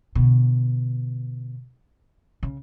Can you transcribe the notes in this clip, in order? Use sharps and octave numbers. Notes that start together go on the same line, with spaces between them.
B2 D3
C#3